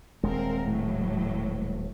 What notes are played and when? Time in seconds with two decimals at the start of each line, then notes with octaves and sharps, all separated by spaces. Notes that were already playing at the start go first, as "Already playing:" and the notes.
0.23 D#1 G#3 C4 A#4
0.65 A2 F#3